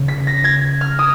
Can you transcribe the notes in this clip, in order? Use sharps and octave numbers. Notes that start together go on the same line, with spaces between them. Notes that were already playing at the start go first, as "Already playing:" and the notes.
Already playing: C#3
B6
A#6
G#6
F6
D#6